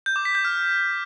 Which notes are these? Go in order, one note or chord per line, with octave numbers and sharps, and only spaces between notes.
G6
D6
B6
G6
F6